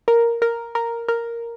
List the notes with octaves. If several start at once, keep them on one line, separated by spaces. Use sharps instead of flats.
A#4
A#4
A#4
A#4